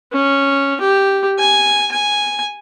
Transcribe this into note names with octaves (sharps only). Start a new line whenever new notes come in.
C#4
G4
G#5
G#5